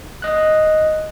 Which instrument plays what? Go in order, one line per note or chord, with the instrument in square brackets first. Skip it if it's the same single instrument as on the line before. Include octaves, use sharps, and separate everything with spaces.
[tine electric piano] D#5 F#6